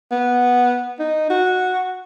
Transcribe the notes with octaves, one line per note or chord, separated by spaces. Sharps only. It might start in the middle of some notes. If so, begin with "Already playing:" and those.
B3
D#4
F#4